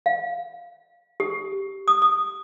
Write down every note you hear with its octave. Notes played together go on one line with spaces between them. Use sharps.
F5
G4
D#6
D#6